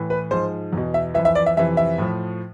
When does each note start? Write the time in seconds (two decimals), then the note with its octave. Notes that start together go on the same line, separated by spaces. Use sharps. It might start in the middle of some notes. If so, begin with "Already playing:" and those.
Already playing: A2 E3
0.10 B4
0.31 G#2 F3 C5
0.73 E2 B2
0.94 E5
1.14 E3 E5
1.18 F2
1.25 E5
1.35 D5
1.46 E5
1.57 F2 C3 E3 E5
1.77 E5
1.98 A2 F3